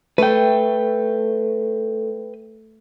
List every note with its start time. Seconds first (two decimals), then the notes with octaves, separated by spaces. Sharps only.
0.18 A3 B4 G5